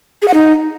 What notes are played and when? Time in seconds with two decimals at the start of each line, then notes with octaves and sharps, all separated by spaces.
0.22 G#4
0.28 F#5
0.34 D#4